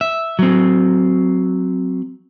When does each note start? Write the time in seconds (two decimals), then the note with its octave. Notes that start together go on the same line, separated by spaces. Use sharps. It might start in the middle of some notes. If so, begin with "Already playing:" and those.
0.01 E5
0.39 F#3 C4